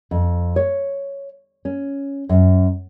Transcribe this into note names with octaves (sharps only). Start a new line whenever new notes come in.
F2
C#5
C#4
F#2